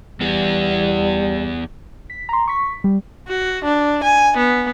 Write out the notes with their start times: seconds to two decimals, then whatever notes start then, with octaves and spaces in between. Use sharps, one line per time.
0.21 E2 G3 B3
2.10 B6
2.29 A#5 C6
2.48 C#6 B6
2.84 G3
3.28 F#4
3.64 D4
4.04 G#5
4.37 B3